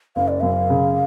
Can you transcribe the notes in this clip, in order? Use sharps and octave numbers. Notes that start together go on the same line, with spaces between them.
F#1 F5
D5
F#2 F5
C#3